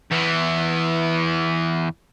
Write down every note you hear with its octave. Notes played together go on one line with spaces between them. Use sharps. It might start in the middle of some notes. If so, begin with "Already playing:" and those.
E2 E3